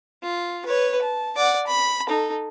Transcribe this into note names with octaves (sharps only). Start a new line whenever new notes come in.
F4
B4 C#5
A5
D5 F#5
B5
D#4 A4